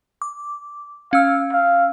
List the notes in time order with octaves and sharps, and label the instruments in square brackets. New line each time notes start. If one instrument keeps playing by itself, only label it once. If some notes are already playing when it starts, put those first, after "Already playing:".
[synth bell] D6
[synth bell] C#4 E6 [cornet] F5
[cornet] F5